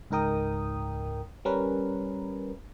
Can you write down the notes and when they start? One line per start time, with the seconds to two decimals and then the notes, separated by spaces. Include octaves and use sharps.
0.10 C#2 G#2 D#4 A#4 G5 D#6
1.45 G3 C#4 A#4 B4